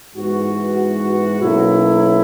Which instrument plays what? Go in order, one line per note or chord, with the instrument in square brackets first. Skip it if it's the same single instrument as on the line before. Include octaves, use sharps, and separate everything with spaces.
[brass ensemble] G#2 E3 B3 F#4
B1 B2 A#3 C#4 E4